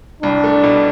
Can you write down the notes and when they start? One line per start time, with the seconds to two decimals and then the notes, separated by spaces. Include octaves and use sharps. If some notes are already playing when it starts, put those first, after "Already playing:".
0.23 C2 D4
0.44 A3
0.63 B2